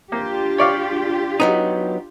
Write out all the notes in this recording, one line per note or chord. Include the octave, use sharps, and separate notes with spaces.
A#3 D4 F4 G4
C#5 D5 F5
F#3 B3 D#4